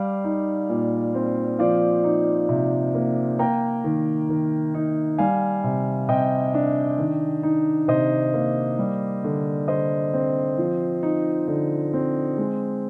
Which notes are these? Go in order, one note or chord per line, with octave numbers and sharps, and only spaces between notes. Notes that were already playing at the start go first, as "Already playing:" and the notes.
Already playing: G3 D5 F5
D#4
A#2
C4
F3 D5 F5
D#4
C3
A#3
A#3 G5 A#5
D#3
D#3
D#4
G3 F5 G#5
C3
C3 D#5 G5
D4
D#3
D#4
C3 C5 D#5
A#3
G3
D3
D3 C5 D#5
C4
F3
D#4
D3
C4
G#3